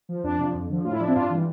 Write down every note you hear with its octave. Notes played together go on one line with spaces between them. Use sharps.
F3
F2 D4
C3 F3
F2
D3 F3
A2 F4
E4
F3 D4
C4 E4
G2 D4 F4
E3 G3